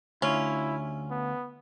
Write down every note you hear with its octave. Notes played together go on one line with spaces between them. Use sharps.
D2 C#4 E4 F4
B3